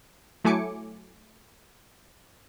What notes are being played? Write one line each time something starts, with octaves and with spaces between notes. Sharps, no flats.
F#3 A3 E4 G#5 D6 C#7